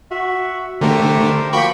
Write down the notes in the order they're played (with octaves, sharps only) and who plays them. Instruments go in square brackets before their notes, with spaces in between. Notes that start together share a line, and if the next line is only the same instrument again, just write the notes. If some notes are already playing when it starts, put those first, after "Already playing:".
[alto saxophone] F#4 [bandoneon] E5
[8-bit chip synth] D3 A3 [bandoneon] G4 A#4 C5 [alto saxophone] G5
[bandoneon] F3 A#3 [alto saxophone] F#4 [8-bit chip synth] G5 B5 C#6